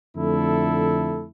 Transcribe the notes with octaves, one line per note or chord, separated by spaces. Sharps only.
F2 D3 A3 E4 A4